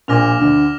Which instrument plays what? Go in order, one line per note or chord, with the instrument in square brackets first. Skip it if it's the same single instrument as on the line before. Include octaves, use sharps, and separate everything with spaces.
[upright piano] A#1 A#2 [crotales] D6 F6 A#6 F7
[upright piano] D2 D3